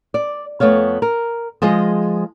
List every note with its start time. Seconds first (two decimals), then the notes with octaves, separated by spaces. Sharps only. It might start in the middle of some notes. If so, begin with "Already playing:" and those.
0.14 D5
0.60 F2 A3 B3 C#5 F5
1.02 A#4
1.62 F3 G#3 G#4 D#5